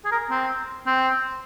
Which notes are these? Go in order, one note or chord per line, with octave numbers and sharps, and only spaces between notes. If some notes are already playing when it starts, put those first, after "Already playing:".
G#4
A#4
C4
C4